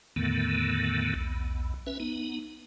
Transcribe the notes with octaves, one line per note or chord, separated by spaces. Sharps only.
E2 A2 D3 D#3 A3 B3
B1 E2
C#4 B4 E5
B3 D#4